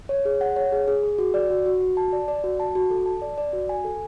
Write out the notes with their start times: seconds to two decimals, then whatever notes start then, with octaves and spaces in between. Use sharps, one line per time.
0.09 C#5
0.25 G#4
0.41 F#5
0.56 C#5
0.72 G#4
0.88 G#4
1.03 G#4
1.19 F#4
1.34 D5
1.50 F#4
1.66 F#4
1.81 F#4
1.97 A5
2.13 D5
2.28 D5
2.44 F#4
2.60 A5
2.75 F#4
2.90 A4
3.06 A5
3.22 D5
3.38 D5
3.53 F#4
3.69 G#5
3.84 A4